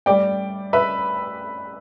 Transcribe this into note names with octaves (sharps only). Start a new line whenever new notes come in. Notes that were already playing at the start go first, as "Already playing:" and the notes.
A2 G3 D5 G5
B4 E5